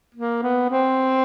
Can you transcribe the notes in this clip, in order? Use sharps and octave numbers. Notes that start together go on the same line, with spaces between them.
A#3
B3
C4